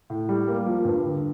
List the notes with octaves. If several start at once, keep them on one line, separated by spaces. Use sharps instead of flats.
A2
G3
A#3
F3
G2
D3